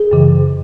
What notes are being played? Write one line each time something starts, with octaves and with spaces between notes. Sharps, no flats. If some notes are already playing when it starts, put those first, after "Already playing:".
Already playing: G#4
F#2 C#3 E3